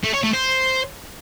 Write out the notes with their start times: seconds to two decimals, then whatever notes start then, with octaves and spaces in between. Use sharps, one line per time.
0.04 A3
0.14 C#5
0.23 A3
0.33 C5